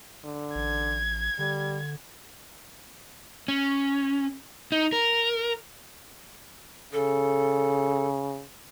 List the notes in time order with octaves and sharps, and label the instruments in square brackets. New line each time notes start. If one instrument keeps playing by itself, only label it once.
[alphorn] D3
[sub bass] A1 [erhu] G#6
[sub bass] D3 [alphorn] G3
[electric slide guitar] C#4
D#4
A#4
[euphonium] C#3 [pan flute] A4